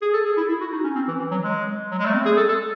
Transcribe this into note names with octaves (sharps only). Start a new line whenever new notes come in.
G#4
A4
G#4
E4
E4
F#4
D#4
C#4
C4
E3
E3
F#3
G#3
F#3
G#3
A3
C4
G#4
A4
A4